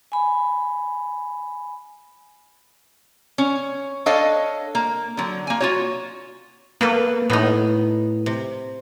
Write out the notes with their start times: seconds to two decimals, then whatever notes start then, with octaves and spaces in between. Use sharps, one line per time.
0.12 G#5 B5
3.38 C#4 C#5
4.06 D4 A4 C#5 D#5 F5
4.75 A#3
5.17 D3 F#3
5.47 A#3 G#5
5.61 F4 F#4 C#5
6.81 A#3 B3 A4 B4
7.30 A2 B3 D#4
8.26 C3